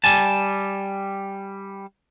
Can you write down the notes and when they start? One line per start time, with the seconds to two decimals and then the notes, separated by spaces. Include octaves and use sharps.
0.04 G3 G#5 A5